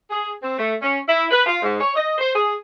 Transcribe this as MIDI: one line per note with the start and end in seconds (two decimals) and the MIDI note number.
0.10 0.32 68
0.42 0.55 60
0.59 0.74 57
0.82 0.98 61
1.08 1.26 64
1.31 1.42 71
1.46 1.62 65
1.62 1.77 44
1.81 1.92 73
1.96 2.17 75
2.17 2.33 72
2.35 2.54 68